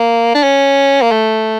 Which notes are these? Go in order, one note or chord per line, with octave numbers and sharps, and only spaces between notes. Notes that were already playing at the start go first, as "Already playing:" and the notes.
Already playing: A#3
D4
C#4
A#3
A3